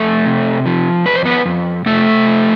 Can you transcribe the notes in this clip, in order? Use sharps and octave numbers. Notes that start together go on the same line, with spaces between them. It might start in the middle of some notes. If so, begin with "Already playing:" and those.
Already playing: F2 A3 A4
C3
F3
F2 B4
C5
B3 B4
F2
C3 A3 A4
F3